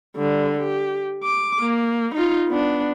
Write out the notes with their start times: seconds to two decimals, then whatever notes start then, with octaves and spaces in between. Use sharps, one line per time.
0.16 D3 G3
0.59 G4
1.24 D6
1.60 A#3
2.15 D#4 F4
2.47 B3 D4